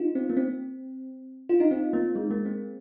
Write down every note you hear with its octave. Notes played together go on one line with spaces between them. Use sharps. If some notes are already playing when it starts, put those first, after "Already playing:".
Already playing: D#4 F4
C4
A#3
C4
F4
D#4
C4
A#3
G#3
A#3
C4